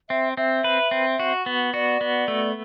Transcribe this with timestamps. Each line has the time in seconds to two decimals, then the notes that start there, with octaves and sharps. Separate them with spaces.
0.09 C4 E5
0.37 C4 E5
0.64 B4
0.91 C4
1.19 F#4
1.46 B3
1.73 F#4 D5
2.01 B3
2.28 A3